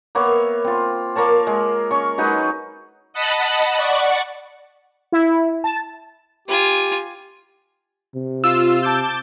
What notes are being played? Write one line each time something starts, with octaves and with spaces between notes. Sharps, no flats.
A#3 B3 C#5 E5
C4 F4
A#3 A#4 C#5 A5
G#3
C#4 C#6
F#3 G#3 D#4 B4
D#5 F#5 A5 B5
D5 F#5 C#6
E4
A5
F4 G4 G#5
C3
F4 E6
A5 D6 G6